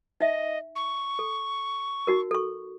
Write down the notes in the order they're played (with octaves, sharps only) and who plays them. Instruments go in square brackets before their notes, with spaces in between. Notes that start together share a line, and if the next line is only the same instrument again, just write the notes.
[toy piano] D#4 E5 [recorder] D#5
[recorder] C#6
[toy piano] A4
D#4 F#4 A#4
A4 C#6